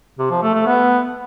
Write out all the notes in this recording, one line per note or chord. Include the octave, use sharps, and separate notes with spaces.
C3
F3
A3
A3
B3